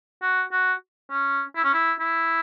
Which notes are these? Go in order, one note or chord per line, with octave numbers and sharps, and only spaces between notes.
F#4
F#4
C#4
E4
C#4
E4
E4